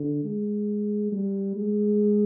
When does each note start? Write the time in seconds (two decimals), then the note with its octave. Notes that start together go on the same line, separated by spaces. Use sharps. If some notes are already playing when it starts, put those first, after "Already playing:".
Already playing: D3
0.24 G#3
1.12 G3
1.56 G#3